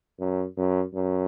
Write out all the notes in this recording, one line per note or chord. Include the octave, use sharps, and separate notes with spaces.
F#2
F#2
F#2